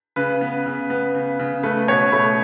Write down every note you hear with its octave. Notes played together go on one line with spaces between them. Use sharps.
C#3 B4
B3
C#3
B3
C#3
C#3
A3 B4
B2 C#5
A3 B5